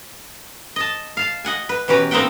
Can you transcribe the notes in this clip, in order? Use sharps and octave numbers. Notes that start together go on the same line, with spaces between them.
D#5 A5
F5 A5
D#5 F#5 G#5
B4
B2 E3 C#4 G4 B4 A#5
A#3 C4 D#4 E5 F#5 G5